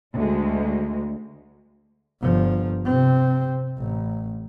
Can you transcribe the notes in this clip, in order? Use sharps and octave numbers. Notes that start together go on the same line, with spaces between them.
D2 G#3
G1 F3
C3 C4
A1